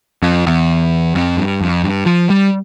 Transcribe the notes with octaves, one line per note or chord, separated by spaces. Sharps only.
F2
E2
F2
G2
F2
G2
F3
G3